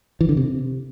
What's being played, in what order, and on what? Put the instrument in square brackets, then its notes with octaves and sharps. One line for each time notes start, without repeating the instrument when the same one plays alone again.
[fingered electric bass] E3
D3
C3